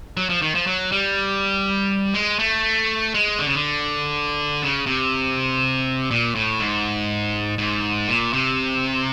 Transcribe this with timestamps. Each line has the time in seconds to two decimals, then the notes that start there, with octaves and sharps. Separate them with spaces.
0.17 F#3
0.29 F3
0.42 D#3
0.55 F3
0.67 F#3
0.92 G3
2.14 G#3
2.39 A3
3.14 G#3
3.39 D3
3.46 C#3
3.55 D3
4.63 C#3
4.86 C3
6.11 A#2
6.35 A2
6.60 G#2
7.58 G#2
8.08 A#2
8.33 C3